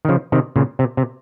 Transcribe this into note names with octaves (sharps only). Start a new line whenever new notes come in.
D#3
C#3 F3
C3 D#3
A#2 C#3
C3
C3